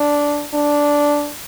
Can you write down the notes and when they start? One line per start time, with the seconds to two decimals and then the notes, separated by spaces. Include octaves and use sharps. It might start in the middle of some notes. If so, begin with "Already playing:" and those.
Already playing: D4
0.54 D4